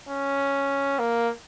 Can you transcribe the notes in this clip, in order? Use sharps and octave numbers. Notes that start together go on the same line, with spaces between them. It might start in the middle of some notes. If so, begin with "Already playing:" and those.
C#4
A#3